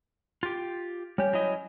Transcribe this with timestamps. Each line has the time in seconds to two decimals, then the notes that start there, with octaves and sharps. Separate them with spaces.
0.43 F4 G4
1.18 G3 C#4 G4
1.33 F#3 E4 D#5